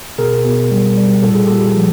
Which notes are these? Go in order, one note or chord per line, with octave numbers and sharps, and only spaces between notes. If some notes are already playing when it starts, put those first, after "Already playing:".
B2 G#4 A#4
B2
G3
G3
A#2 A4
G#4
A#2 G4 A4
F3